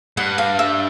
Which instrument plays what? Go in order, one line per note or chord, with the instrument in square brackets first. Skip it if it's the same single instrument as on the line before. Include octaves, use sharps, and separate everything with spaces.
[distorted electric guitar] G2 [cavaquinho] F#5
[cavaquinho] F5
E5